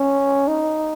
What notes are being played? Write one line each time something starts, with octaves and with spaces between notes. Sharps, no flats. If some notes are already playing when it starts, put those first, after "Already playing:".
Already playing: C#4
D#4